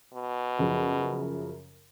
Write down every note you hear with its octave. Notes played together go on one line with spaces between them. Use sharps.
B2
F#2 C#3 F3